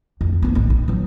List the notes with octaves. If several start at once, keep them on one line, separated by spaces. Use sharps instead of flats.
F2
F3 B3
A1
D#4
E3 F#3